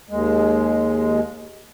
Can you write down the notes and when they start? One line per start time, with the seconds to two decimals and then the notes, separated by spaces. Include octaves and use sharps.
0.09 D#2 G#3